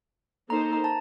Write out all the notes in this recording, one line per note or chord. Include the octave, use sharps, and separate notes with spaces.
A#3 D#4 A4 C5 A#5
A#5
A5